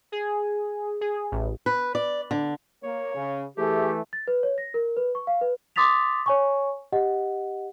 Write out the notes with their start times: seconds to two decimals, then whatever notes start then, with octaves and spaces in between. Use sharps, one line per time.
0.12 G#4
1.01 G#4
1.32 A1
1.66 B4
1.95 D5
2.31 D3
2.83 A#3 C#5
3.15 C#3
3.57 E3 A3 G4 G#4
4.13 A6
4.28 B4
4.43 C#5
4.58 A#6
4.74 A#4
4.97 B4
5.15 C#6
5.27 F5
5.41 B4
5.76 C6 D6 D#6 A6 B6 F7
6.26 C#5 G#5 C#6
6.92 G4 D#5 F#5